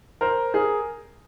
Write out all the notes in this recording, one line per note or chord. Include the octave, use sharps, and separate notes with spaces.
A#4 C5
G#4 A#4